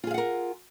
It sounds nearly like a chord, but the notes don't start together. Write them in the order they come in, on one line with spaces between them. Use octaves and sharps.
F4 G#4 F5 F#5 A#4